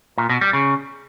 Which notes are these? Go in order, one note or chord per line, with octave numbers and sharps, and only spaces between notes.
A#2
B2
G3
C#3